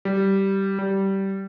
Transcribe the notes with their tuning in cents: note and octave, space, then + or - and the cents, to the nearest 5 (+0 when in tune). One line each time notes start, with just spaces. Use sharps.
G3 -10
G3 -15